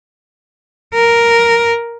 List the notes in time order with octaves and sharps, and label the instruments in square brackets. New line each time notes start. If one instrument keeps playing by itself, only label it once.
[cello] A#4